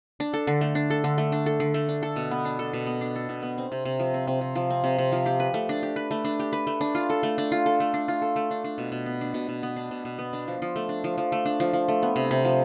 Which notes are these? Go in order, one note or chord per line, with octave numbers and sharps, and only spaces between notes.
D4
A4
D3
A3
D4
A4
D3
A3
D4
A4
D3
A3
D4
A4
B2
B3
D4
A4
B2
B3
D4
A4
B2
B3
C4
C3
C3
F3
C4
C3
C3
F3
C4
C3
C3
F3
G4
B4
A3
D4
G4
B4
A3
D4
G4
B4
A3
D4
F4
A4
A3
D4
F4
A4
A3
D4
F4
A4
A3
D4
D4
B2
B2
B3
D4
B2
B2
B3
D4
B2
B2
B3
D4
F3
F3
A3
D4
F3
F3
A3
D4
F3
F3
A3
B3
C3
C3
F3